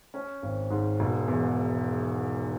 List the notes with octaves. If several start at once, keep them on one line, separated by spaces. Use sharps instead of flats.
C#4
G#1
G#2
E1
E2